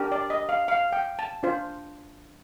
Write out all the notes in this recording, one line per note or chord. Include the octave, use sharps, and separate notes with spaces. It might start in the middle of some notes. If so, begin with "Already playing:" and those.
Already playing: D4 G4 A#4
D5
D#5
F5
F5
G5
A5
D4 F4 C5